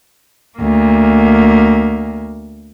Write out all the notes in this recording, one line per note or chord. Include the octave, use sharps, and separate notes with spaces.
D2 A#3